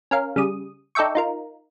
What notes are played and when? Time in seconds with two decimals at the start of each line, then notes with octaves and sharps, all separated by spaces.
0.11 C#4 A#4 F5
0.36 C#3 G3 D#6
0.95 D#4 A4 D5 E5 G5 C#6
1.15 D#4 F4 A#4